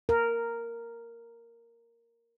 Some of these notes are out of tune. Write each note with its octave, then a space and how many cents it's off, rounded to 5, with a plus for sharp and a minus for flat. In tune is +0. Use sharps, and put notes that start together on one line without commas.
A#4 -5